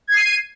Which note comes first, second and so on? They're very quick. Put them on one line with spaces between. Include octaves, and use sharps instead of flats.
G#6 C7 D#7